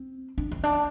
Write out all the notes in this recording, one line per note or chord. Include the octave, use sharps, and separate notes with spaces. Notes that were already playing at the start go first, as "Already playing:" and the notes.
Already playing: C4
D4
C4
D4